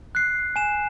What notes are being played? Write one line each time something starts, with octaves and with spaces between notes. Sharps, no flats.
F#6 C7
G#5 E7